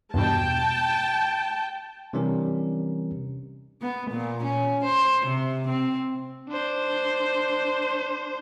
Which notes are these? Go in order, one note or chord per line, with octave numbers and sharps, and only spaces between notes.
E2 G2 B2 G5 A5
C3 E3 G3 C#4 D4 A#4
B3
A#2
C#4
C5
C3
C4
D4 C5